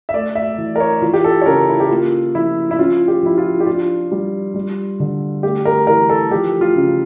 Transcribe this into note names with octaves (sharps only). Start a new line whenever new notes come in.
E5
A3 D5
E5
E3
A#4
C#5
E3 F4
G4
A4
C#5
C#3 A#4
E4
G4
A#3 F4
F3 E4
E4
C#4 F4
G4
F3 E4
F4
G4
D4 F4
G3
G3
D3
A3 G4
A#4
E3 A#4
A4
F3 G4
F4
C#3